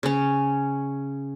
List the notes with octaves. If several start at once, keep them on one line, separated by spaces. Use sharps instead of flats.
C#3 C#4